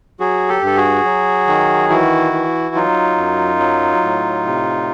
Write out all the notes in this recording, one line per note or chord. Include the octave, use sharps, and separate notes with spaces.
F#3 F#4 G#4
G4 A4
G2 A4
F#4 G#4
F#3
D#3
E3 E4 F#4
E3
F#3 D#4 F4
F#2
F#3
A2
C3